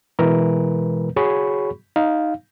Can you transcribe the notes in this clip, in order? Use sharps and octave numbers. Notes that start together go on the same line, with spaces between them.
B2 E3 G#3 A#4 B4
F#4 G#4 C#5 B5 C#6
D#4 F5